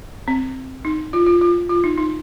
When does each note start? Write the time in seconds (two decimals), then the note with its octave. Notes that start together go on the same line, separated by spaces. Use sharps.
0.28 C4
0.85 D#4
1.13 F4
1.27 F4
1.41 F4
1.69 F4
1.84 D#4
1.98 D#4